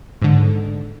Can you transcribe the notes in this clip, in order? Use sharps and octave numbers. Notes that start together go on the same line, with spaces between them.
G#2 D3